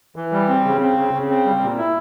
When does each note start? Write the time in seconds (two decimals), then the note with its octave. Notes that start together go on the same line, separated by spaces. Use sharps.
0.16 E3
0.32 G3
0.49 C4
0.65 C#3
0.81 C4
0.97 C#3
1.13 C#3
1.30 C4
1.45 G3
1.61 A#2
1.78 E4